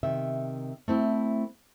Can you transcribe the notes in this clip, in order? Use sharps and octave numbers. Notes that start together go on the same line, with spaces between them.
C3 D#3 E5
A3 C4 E4